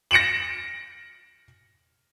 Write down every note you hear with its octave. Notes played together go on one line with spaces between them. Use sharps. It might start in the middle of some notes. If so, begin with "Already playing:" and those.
A#6 C#7 D7 E7 F#7